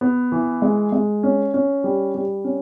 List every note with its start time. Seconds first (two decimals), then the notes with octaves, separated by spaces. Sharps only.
0.01 B3
0.32 E3
0.62 G#3
0.92 G#3
1.23 C#4
1.54 C#4
1.84 G3
2.14 G3
2.44 C#4